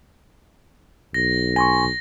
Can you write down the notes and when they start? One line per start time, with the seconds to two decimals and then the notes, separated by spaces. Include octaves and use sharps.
1.14 B1 A#6
1.56 G#5 C6 C#6 A#6